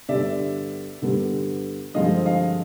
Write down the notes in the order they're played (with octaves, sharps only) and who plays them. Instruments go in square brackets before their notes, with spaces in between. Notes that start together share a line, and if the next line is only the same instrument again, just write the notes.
[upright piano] G2 D3 G3 B3 D5 E5
G2 D3 G3 B3
G2 D3 F3 G#3 C4 D#5 F5
D#5 F5